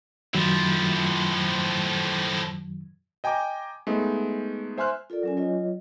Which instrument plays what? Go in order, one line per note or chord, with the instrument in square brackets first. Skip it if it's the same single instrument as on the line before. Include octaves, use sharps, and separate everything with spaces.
[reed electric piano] F#2 D#3 F#3 [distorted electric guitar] A2 F3
[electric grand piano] D#5 G5 G#5 A#5 D6
G#3 A3 B3 D#4
C5 E5 G#5 C6 F6 F#6
[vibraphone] F4 A4 A#4 D5
F#3 C#4 G#5
F#3 F4 C#5 D#5